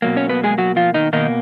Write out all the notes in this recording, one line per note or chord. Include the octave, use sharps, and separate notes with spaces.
B2 F#3 A#3
C#4 C#5
B3 B4
G#3 G#4
F#3 F#4
F3 F4
D#3 D#4
B2 D#3 A#3 D#4